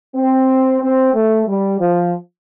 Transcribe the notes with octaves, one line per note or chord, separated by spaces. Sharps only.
C4
C4
A3
G3
F3